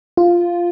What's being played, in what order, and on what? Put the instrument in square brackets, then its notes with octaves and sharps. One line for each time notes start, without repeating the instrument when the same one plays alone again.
[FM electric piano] F4